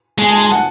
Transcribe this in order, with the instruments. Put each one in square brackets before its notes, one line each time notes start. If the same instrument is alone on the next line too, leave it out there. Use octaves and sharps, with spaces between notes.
[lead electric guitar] G#3 [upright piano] G#5
[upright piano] A5
A5
F#5